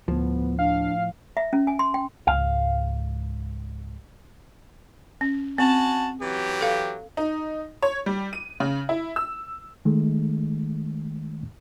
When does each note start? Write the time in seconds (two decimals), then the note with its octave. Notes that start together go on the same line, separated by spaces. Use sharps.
0.08 D2 A2 F3 B3
0.59 D4 F5
1.37 E5
1.53 C#4
1.67 G#5
1.79 C6
1.94 G5
2.27 C#2 G#2 F5
5.21 C#4
5.58 C4 F#4 G#5 A5
6.21 E3 F#3 G4
6.61 A4 F5
7.17 D#4
7.83 C#5
8.06 G3
8.33 D#7
8.60 C#3
8.89 E4
9.16 E6
9.85 D#3 G#3 A3